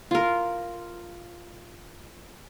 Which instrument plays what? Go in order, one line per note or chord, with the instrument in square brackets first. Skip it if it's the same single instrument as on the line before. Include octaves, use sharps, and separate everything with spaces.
[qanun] F4 A#4